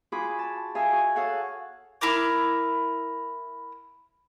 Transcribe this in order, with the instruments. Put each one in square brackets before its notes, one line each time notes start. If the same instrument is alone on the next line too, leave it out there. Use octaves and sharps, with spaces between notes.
[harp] F4 F#4 G#4 B5 D6
A5
G#4 E5 F5 G#5
F#4
G#4 A4 C#5 F5 F#5
[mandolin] E4 A#4 D6